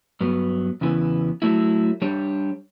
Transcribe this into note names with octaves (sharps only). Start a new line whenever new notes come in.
G2 F#3 B3
E2 C#3 E3 B3
F#3 A3 E4
G3 D4 G4 C#5